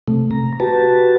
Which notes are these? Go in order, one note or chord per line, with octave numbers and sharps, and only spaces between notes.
C3 A3
A#5
F#4 G4 B4 A5